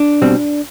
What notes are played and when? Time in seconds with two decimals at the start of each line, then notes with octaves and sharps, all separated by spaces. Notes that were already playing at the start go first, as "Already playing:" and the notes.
Already playing: D4
0.22 B2 G3 C4